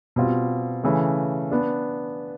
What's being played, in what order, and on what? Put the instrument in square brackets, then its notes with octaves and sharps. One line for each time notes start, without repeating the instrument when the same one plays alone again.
[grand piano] B2 G3 C4 F4
C#3 E3 A3
B3 D4